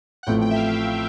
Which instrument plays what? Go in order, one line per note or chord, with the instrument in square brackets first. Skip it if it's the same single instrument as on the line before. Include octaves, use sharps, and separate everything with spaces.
[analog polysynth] F#5
[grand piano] A1 A2 F3 A3 C4 [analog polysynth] G5
[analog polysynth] G5
E5
F5